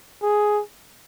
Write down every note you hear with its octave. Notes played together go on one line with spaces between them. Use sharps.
G#4